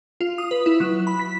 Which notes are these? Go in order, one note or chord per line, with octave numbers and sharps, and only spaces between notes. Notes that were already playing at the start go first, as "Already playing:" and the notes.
F4
D#6
B4
E4
F#3
B5
B6